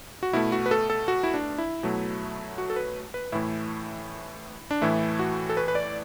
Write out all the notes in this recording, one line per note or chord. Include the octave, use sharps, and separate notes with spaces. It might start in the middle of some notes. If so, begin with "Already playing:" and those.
F#4
B2 A3 E4
F#4
B4
A4
A4
F#4
E4
D4
E4
B2 F#3 A3
F#4
A4
B4
B4
A2 E3 A3 E4
D4
A2 E3 A3 E4
F#4
A4
B4
B4
D5